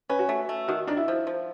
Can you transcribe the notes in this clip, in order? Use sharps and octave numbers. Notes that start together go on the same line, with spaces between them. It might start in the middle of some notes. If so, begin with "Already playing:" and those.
C#4 B4
F#4
A3
A3
D#3 F#4
D#3 D4
E4
F3
F3